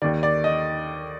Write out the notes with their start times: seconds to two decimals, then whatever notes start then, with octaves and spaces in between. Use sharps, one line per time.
0.02 D#2 D#3 D5
0.23 D5
0.44 D#5